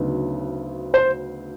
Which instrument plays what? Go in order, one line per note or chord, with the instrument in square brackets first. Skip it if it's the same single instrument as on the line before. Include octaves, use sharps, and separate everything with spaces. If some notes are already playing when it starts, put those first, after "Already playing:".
Already playing: [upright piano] D2 C#3 F#3 B3 D#4
C5 C6